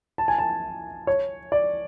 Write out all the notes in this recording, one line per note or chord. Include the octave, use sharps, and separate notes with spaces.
A5
G#5
A5
C#5
D5